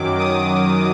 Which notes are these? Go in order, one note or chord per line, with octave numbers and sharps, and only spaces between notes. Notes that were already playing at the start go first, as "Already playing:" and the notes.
Already playing: F#2 D#3 F#3 D6
D#6